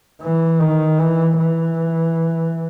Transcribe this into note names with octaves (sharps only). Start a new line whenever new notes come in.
E3
D#3
E3
E3